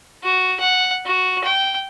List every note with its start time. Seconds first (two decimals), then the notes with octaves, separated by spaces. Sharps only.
0.23 F#4
0.60 F#5
1.05 F#4
1.44 G5